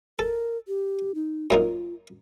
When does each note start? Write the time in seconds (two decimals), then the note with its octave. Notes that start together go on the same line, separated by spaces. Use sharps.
0.19 A4 A#4
0.68 G4
1.15 D#4
1.50 F#2 A#3 D#4 F4